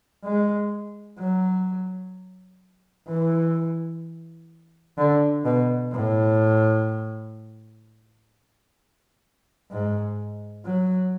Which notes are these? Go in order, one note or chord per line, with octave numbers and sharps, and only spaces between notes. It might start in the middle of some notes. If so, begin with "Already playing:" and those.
G#3
F#3
E3
D3
B2
A2
G#2
F#3